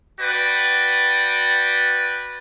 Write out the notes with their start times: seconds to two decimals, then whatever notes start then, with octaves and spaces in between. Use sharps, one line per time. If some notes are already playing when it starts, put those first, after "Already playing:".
0.21 F#4 B4 D5 G5